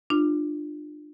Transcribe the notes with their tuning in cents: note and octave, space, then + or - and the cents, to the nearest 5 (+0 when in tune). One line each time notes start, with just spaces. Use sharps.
D4 +30 F4 +0